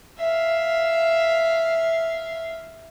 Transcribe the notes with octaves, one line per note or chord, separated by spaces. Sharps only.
E5 F5